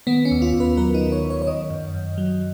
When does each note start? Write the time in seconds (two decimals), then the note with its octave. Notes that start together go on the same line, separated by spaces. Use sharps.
0.07 D#3 B3
0.25 C#4
0.31 D#2
0.42 F4
0.53 D#2
0.60 B4
0.77 F#3 A#4
0.94 D#4
1.01 D#3
1.12 C#5
1.24 D#2
1.30 C#5
1.42 C#5
1.47 D#3 D#5
1.70 F#2
1.94 F#2
2.18 F#3